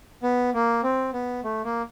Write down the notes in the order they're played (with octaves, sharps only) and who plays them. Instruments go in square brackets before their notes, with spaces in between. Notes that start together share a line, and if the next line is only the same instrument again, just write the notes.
[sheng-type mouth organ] B3
A#3
C4
B3
A3
A#3